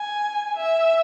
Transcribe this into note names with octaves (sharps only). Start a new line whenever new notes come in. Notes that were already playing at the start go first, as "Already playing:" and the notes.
Already playing: G#5
E5